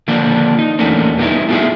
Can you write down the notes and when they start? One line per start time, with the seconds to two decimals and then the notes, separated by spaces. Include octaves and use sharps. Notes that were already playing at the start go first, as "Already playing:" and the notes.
0.08 D3 D#3 F3 A#3 D4
0.59 D#4
0.79 E2 A3 A#3 C#4 D4
1.18 G3 A#3 B3 C#4 D#4 E4
1.49 A3 B3 F4 F#4 G#4 E5